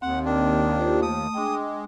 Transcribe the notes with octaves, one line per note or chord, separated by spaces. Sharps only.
D#2 C4 F#5
D#3 D4
F4 G4 C5
A3 D#6
G#3 D4 G5